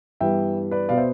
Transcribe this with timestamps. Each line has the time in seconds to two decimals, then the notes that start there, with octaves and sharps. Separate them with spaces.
0.21 G2 E3 G3 B3 E5 G5
0.71 B4 D5
0.89 B2 B3 D5 F5
0.98 C5 E5